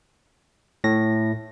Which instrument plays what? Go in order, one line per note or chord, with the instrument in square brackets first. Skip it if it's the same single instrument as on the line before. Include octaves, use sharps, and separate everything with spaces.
[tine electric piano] A2 A#6